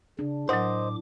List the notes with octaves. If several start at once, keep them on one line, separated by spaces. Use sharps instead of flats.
C#3 D4
A2 F#3 A#4 C5 D#5 F#5 D6